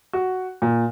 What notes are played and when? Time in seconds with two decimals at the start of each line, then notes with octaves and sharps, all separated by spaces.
0.13 F#4
0.62 A#2